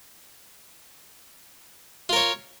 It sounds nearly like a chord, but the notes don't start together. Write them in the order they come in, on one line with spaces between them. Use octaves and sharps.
F4 A#4 C#5